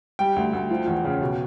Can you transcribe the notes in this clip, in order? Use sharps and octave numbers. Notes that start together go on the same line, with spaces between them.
G3 G5
D2
D2
F3
E2
C#3
B2